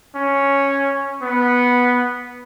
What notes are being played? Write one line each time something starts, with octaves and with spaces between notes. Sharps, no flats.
C#4
B3